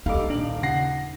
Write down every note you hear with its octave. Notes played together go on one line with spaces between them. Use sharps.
B1 G3 D#4 A4 D#5 F5 D6
D#1 D4 D7 F#7
C#3 F#5 A#6 C7